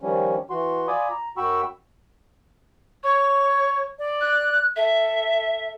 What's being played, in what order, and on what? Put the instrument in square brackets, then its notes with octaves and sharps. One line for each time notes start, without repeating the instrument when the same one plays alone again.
[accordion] D#3 F3 G3 C#4
E3 F#4 C6
F4 D5 G#5 B5 D6 D#6
A#5
F#2 F#4 G5 B5 C#6 E6
[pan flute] C#5 [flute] C#6
[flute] D5
[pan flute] F#6
[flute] A4 [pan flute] E5